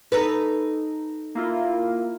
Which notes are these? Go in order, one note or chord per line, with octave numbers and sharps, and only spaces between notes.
D#4 A4 B4
A#3 E4 F4